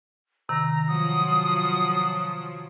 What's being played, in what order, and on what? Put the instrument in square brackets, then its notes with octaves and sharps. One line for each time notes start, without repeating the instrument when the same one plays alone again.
[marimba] C3 D#3 [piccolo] A#5
[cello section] F3 F#3 [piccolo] D#6